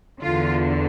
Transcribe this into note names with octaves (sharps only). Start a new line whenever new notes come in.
E2 D3 F4